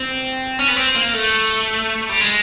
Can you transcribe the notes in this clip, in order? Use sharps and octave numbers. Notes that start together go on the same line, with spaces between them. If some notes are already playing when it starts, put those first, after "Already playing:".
Already playing: C4
C#4
B3
C4
A#3
A3
G3
G#3